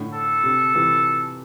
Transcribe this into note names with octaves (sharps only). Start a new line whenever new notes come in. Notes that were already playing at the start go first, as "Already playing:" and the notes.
Already playing: A2 D3
A4
C3
C3 E3